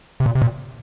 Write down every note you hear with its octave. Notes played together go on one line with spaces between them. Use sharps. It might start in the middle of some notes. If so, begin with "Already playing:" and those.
C3
A#2
C3
A#2